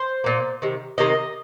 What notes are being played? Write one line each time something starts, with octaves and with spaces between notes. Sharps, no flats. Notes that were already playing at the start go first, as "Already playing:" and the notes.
Already playing: C5
A#2 A#3
C3 D#3
C3 D#3 A#3 D#5